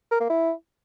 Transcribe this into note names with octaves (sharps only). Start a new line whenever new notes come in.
A#4
A#3
E4